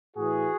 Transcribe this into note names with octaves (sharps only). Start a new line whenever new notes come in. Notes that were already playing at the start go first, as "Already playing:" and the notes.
A2 E3 F#4 G#4